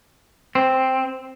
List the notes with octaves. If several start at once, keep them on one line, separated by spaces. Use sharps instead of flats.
C4